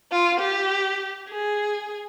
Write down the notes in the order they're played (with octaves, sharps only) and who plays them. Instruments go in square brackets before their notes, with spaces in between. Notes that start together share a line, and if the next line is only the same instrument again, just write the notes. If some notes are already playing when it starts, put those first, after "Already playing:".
[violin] F4
G4
G#4